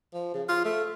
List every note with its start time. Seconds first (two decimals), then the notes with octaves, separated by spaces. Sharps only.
0.13 F3
0.33 C#3
0.48 F4
0.64 A3